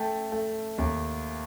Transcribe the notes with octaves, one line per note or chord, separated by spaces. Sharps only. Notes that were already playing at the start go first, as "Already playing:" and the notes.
Already playing: A3 G5 A5
A3
D#2